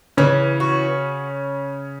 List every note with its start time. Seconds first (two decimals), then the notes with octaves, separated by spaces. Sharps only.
0.17 C#3 E3 C#4
0.60 F#4